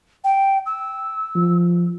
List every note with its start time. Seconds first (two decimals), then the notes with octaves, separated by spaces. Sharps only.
0.24 G5
0.65 E6
1.35 F3